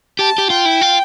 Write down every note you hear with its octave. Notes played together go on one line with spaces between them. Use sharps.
G4 A5
G4
F4 G5
E4
F4